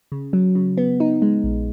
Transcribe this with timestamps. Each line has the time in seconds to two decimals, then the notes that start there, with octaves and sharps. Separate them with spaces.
0.12 C#3
0.33 F#3
0.55 C#3
0.78 B3
1.00 D#4
1.22 G#3
1.44 A#1